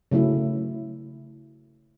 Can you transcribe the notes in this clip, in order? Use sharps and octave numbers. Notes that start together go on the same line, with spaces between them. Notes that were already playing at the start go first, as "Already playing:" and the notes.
C#3 F#3 A3 E4